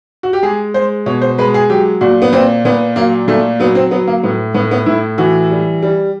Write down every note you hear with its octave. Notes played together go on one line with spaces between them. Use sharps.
F#4
G4
G#3 G#4
G#3 C5
B2 C#5
C5
G#3 B4
G#4
F#3 G4
A#2 F#4
B3
A#2 C4
A#2 B3
F#3 A#3
A#2 A3
F#3 B3
C4
F#3 B3
A#3
A2 B3
A2 B3
B3
A2 E4
E3 F#4
G3
G3